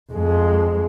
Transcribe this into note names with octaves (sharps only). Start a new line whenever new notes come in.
F2 G#3